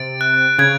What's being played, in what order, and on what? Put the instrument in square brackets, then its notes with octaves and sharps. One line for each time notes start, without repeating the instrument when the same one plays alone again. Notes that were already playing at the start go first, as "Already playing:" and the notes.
Already playing: [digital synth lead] C3 [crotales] A6 D7
[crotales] F#6
[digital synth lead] C#3 [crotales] G#6